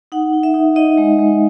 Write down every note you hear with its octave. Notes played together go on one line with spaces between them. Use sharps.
D#4 F#5
D#4
E5
D#4
D#4 D#5
G#3
G#3